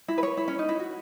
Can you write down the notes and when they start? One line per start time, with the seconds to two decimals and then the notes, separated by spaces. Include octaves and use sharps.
0.08 E4
0.18 B4
0.23 C#5
0.37 E4
0.48 C#4
0.59 D#4
0.69 E4
0.80 F#4